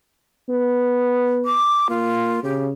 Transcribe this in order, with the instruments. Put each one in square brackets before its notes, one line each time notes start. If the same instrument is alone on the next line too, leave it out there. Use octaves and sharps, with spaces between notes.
[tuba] B3
[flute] D6
[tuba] A#3 [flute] F4
[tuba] C#3 [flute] G4